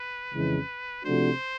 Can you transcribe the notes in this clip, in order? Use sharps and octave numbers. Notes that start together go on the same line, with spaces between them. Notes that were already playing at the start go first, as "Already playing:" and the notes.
Already playing: B4
F2 C#3 E3 G#3 C#4
C3 F3 A3 D4 F#4 C5